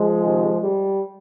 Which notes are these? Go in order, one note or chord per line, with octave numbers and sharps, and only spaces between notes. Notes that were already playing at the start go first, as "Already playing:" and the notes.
Already playing: F3 G#3
C3 D#3
G3